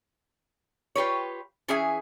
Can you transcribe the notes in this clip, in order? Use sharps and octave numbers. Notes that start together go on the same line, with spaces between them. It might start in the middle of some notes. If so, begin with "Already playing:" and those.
F4 G4 B4 C#5
E3 C#4 G#4 E5 G#5